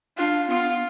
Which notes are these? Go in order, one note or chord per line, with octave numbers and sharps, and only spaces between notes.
D4 F4
B3 F4